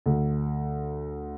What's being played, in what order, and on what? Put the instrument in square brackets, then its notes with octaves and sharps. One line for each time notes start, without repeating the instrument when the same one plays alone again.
[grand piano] D2